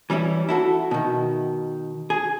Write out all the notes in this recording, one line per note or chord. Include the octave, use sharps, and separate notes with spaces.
E3 G3 C#4 E4
E4 F#4 A4
B2 D#3
G#4